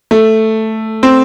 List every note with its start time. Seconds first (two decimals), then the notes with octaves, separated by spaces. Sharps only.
0.11 A3
1.03 C4